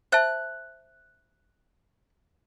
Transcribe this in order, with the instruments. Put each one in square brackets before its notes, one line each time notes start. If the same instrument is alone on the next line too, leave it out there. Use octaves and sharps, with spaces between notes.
[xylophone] C5 E5 A5 [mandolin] F#6